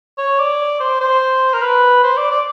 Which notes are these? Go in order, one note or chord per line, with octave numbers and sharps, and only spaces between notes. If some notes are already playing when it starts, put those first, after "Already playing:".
C#5
D5
C5
C5
A#4
B4
C5
D5
D5